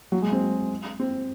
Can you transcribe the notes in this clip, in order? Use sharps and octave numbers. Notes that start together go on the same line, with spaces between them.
F#3
G#3
C4
C4